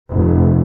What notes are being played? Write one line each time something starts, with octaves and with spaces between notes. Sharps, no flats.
F1